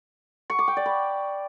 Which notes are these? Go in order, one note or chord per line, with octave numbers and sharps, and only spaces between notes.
C#6
D6
G5
D5
B5